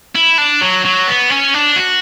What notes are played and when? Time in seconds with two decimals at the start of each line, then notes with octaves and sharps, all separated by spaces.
0.15 E4
0.38 D4
0.61 F#3
0.85 F#3
1.08 B3
1.30 C#4
1.54 D4
1.76 F#4